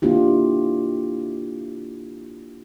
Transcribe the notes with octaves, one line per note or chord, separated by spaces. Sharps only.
A#3 D4 E4 F4 G4